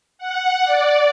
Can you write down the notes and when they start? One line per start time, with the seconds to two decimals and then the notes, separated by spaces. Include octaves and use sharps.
0.18 F#5
0.65 D5